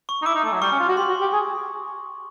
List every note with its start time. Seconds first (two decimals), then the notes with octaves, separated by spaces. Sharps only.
0.09 C#6
0.22 D#4
0.26 E4 D6
0.35 D#4
0.44 A3
0.52 F#3
0.61 G3 C#6
0.71 C#4
0.79 F4
0.88 F#4
0.97 G4 C6
1.09 F#4
1.21 G4
1.33 G#4